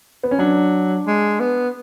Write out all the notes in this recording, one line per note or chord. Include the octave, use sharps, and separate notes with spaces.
B3
C#4
F#3 D4
G#3
B3